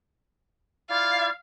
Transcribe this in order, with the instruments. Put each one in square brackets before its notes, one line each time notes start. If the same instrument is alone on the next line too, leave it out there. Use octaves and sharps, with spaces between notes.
[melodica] E4 F4 D5 [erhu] F5